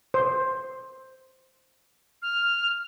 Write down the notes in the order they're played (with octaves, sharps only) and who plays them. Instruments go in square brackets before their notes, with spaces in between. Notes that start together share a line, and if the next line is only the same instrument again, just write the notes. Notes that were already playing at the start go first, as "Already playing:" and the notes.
[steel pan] C5
[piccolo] F6